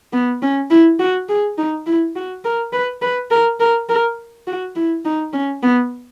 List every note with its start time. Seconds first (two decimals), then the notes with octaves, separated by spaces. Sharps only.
0.13 B3
0.42 C#4
0.71 E4
0.99 F#4
1.29 G#4
1.58 D#4
1.86 E4
2.16 F#4
2.45 A#4
2.73 B4
3.02 B4
3.31 A#4
3.60 A#4
3.89 A#4
4.47 F#4
4.76 E4
5.05 D#4
5.33 C#4
5.63 B3